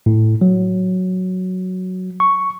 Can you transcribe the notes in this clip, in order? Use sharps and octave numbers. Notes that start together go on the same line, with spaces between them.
A2
F#3
C#6